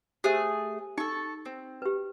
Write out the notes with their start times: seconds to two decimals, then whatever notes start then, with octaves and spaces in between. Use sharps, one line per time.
0.24 A3 G4 G#4 C5
0.98 D#4 A4 C#6
1.45 C4
1.82 G4 B4